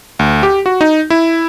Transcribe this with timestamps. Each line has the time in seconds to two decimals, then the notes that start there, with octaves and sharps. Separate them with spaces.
0.19 D2
0.43 G4
0.66 F#4
0.81 D#4
1.10 E4